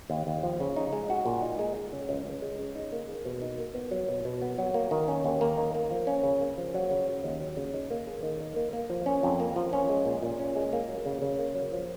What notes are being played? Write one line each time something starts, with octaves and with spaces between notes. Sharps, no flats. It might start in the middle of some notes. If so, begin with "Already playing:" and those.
D#2
D#2
F3
C#3
D#4
G#3
F#4
A#2
D#4
G#3
G#3
C#3
C#2
C#2
G#3
C#3
D#4
A#3
G#4
B2
D#4
A#3
B3
F#3
B2
B2
B3
F#3
A#3
D#3
C#4
D#2
A#3
D#3
A#3
F3
C#4
C#3
A#3
F3
F#3
C#3
C#4
D#2
F#3
C#3
D#4
A#3
G#4
D#3
D#4
A#3
A#3
F3
C#4
F2
A#3
F3
C#4
G#3
A#2
A#2
C#4
G#3
A#3
F#3
C#3
C#3
A#3
F#3
F3